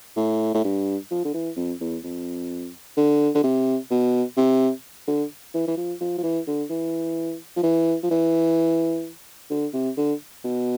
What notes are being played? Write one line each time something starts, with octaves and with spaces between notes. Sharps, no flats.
A2
A2
G2
F3
D3
E3
F2
E2
F2
D3
D3
C3
B2
C3
D3
E3
E3
F3
F3
F3
E3
D3
E3
F3
E3
F3
E3
D3
C3
D3
B2